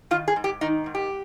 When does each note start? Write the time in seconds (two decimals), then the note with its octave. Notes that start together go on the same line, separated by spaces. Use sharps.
0.11 D#3 F4
0.28 G#4
0.36 G#2
0.44 G4
0.61 D#3 D#4
0.86 G#2
0.95 G4